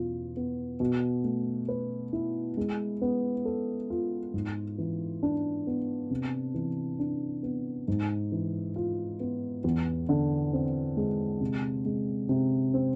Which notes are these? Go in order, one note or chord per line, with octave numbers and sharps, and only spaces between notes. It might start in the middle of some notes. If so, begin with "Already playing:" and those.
Already playing: E2 B2 F4
B3
B2
A3
B4
E4
G#3
B3
A4
F4
G#2
E3
D4
B3
C3
E3
D4
B3
G#2
E3
F4
B3
E2
D3
C4
G#3
C3
G#3
C3
C4